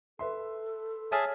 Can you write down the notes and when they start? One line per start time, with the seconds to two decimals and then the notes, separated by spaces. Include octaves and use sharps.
0.19 A4 B4 E5 C6
1.12 G#4 C#5 E5 G#5 A5 F6